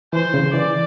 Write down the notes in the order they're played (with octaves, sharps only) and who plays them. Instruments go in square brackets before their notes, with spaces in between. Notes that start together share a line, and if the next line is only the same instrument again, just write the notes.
[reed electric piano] E3 [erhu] C5
[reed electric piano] C#3
[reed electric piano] E3 [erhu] D5